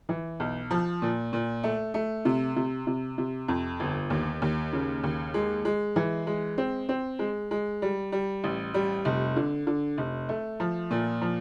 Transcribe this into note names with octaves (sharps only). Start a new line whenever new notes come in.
E3
B1
F3
A#2
A#2
A3
A3
C3
C3
C3
C3
F2
G1
D#2
D#2
C#3
D#2
G#3
G#3
E3
G#3
C4
C4
G#3
G#3
G3
G3
A1
G3
F1
D3
D3
F1
A3
F3
A#2
F3